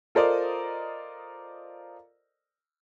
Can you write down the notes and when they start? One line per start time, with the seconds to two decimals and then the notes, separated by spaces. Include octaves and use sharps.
0.15 F4 A4 A#4 C5 D5 D#5